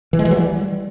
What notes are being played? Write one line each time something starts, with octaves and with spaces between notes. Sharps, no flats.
E3
G#3
E3
F#3
G3